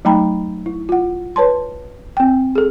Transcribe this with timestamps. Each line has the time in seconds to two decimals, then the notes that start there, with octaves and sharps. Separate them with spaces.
0.05 F#3 A3 D#4 G5 A#5 B5
0.66 E4
0.89 F4 F#5
1.36 B4 C#5 A5 C6
2.17 C4 G5
2.55 G#4 A4